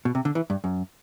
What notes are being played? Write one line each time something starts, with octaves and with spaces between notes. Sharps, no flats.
B2
C3
D3
E3
G2
F#2